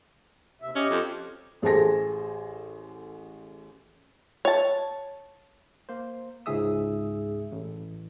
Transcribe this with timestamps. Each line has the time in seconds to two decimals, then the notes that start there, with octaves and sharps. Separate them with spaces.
0.62 D#2 C3 E5
0.75 C#4 G4 D#5
0.90 F2
1.62 A1 G#4 A4 C5 G#5 A#6
4.45 C#5 A5
5.89 A#3 C5
6.46 C#2 G#2 G#4 E5 D#6 E6
7.52 A1